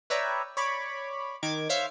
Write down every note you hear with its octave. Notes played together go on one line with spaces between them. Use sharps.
B4 C#5 D5 E5 G5 A#5
C#5 D5 B5 C#6 D6
D#3 D#4 D6 G#6
C5 C#5 E5 F5